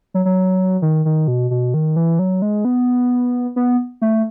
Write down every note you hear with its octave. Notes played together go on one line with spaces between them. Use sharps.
F#3
F#3
D#3
D#3
B2
B2
D#3
E3
F#3
G#3
B3
B3
A3